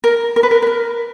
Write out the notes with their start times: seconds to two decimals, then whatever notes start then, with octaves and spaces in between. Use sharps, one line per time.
0.04 A#4
0.36 A#4
0.43 B4
0.51 A#4
0.62 B4
0.67 A#4